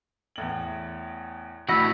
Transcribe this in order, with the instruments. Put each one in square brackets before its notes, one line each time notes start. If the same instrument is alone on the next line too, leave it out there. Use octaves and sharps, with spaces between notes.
[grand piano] E2 A2 F#7
[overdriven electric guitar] A2 F#4 [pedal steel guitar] E3 D#5 E6 [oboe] B5